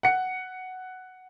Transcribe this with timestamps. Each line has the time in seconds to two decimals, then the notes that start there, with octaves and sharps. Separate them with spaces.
0.03 F#5 C#7